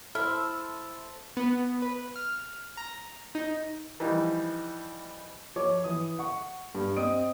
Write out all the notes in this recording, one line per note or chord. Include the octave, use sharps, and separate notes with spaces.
E4 A4 C5 F6
B3
B4
F6
A#5
D#4
E3 F3 G3 D#4
F3 C#5 D6
E3 D#6
F#5 C#6
G2
C4 D#5 D#6 D7